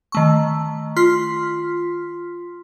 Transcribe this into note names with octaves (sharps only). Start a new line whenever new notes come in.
D#3 A3 C#6
F4 C6 F6 B6